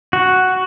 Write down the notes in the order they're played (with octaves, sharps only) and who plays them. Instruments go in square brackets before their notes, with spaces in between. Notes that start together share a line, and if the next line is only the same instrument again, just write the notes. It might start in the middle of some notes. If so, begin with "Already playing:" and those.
[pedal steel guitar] F#4